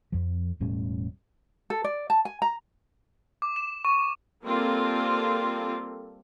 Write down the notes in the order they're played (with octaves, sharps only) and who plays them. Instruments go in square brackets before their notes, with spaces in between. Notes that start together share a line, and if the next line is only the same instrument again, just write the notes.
[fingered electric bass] F2 F3
E1 A2 G3 C#4
[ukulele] A4
D5
A5
G#5
A#5
[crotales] D6
E7
C#6
[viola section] G3 A#3 C4 F4 A4